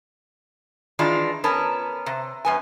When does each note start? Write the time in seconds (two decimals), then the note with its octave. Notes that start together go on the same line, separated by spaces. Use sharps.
0.99 D#3 E3 G#3 D4 F4
1.44 B3 C#4 A#4 A5
2.06 C3
2.45 F#2 B3 G#5